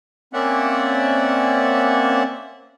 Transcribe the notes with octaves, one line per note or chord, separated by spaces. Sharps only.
A#3 C4 C#4 D5 E5 F#5